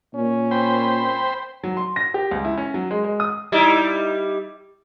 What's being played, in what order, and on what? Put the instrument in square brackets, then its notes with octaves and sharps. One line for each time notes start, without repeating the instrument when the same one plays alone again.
[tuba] A#2 [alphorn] C#4
[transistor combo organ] C5 G5 B5
[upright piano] F#3
C6
A#6
G4
C#2
E4
C#4
F#3
G#3
G#3
D#6
[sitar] G3 D#4 E4